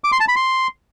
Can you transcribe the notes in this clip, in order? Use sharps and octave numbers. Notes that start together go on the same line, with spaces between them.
D6
C6
A5
B5
C6